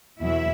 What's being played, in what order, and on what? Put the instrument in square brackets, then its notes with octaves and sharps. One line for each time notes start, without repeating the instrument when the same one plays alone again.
[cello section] E2 B2 F#3 E4 E5